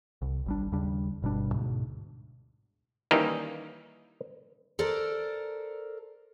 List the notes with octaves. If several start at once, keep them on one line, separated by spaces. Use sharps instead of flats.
C2
G#1 G3 D4
D#2 C#3 G3 D4
G1 B2 G3 D4
D2 G#2 B2
D#3 E3 G3 A#3 C#4 D#4
A4 A#4 C5 D5